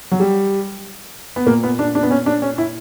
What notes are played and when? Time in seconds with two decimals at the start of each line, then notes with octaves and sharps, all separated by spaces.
0.11 F#3
0.20 G3
1.36 B3
1.46 A#2 A#3
1.63 B3
1.79 D4
1.95 D4
2.03 B3
2.10 C#4
2.26 D4
2.42 C#4
2.58 E4